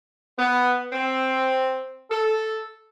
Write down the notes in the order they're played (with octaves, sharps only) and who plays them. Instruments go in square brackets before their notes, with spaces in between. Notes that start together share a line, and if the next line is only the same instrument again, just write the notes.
[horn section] B3
C4
A4